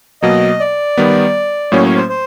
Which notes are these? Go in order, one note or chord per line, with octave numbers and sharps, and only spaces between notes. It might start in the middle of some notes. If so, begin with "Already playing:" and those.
B2 F#3 A#3 D#5
D5
D#3 G3 B3
A2 F#3 A#3 C#4 C#5
C#5
C5
C5